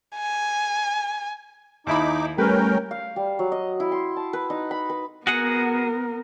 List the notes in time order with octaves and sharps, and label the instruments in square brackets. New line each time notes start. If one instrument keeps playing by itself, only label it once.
[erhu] G#5
[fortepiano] D#2 E4 B5 [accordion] D#4 D6
[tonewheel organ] G3 A3 [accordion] C#4 A#4 G5 [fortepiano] B4
[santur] F5
G3
F#3
D#5
E4
C6
A5
B4
D#4
B5
B4
[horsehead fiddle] B3 A#4 [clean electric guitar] F#4 G#4 F#5